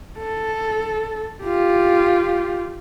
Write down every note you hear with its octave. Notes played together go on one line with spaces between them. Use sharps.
A4
F4 G4